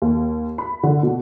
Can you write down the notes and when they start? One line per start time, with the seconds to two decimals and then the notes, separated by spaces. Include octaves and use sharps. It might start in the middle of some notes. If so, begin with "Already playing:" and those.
0.02 D#2
0.58 B5
0.83 D3
1.03 B2